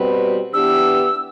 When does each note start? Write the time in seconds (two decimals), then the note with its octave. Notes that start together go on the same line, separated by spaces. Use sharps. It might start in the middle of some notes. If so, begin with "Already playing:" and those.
Already playing: B2 G3 C4 F#4 B4
0.53 E3 B3 D4 G4 E6